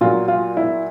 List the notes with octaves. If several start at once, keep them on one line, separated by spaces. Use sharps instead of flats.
A#2 F#3 A#3 F4
F4
E4